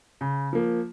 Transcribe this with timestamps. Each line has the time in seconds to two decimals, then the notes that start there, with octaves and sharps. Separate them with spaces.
0.21 C#3
0.53 F3 A#3